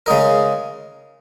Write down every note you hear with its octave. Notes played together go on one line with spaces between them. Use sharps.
C#3 G#3 D#4 A#4